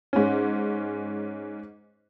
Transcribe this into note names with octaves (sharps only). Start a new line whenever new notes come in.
G#2 C#4